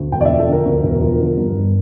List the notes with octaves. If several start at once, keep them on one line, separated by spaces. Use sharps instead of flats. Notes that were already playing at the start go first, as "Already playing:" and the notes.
Already playing: D2
E1 G5
D5
F3 E5
A4
D3 A#4
D2
E1
F3
D3
G2
G1